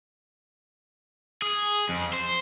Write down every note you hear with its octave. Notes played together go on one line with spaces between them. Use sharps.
G#4
F2
C5